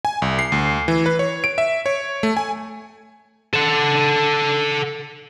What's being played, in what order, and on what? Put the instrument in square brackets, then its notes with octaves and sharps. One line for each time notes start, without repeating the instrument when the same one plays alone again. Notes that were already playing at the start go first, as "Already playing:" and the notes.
[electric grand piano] G#5
C2
C7
D2
E3
B4
C#5
D7
E5
C#5
A3
G#5
[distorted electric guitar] A4 F#5